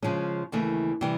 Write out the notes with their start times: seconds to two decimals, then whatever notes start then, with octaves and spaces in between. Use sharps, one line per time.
0.02 C#3 F3 G#3 C#4
0.52 D#2 C#3 E3 A3
1.01 C3 E3 G3